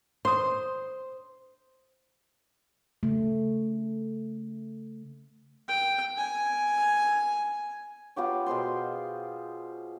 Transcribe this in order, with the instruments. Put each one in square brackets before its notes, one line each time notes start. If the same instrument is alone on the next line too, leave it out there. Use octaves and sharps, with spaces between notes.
[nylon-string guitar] C5 [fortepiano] C6 D#6
[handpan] C#3 A3
[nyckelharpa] G5
G#5
[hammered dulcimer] B3 F4 G4 C#5
B2 G#4 C5 C6